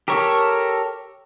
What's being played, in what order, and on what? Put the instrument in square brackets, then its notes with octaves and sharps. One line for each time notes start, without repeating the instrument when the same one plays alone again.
[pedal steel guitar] G4 A4 A#4 C#5